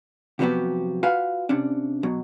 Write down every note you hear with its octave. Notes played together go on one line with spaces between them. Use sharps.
C3 F3 F#3 B3 F#4 G4
F4 F#4 B4 F5 F#5 G#5
C3 C#4 D4
B2 F#3